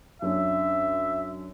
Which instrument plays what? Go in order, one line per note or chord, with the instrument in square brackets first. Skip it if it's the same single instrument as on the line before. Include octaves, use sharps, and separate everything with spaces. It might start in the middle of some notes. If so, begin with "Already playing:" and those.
[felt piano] F#2 C#4 D4 [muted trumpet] E5